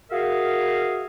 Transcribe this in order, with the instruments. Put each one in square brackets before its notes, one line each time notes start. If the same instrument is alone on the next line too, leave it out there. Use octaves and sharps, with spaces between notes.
[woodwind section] F#4 G#4 A#4 E5 F5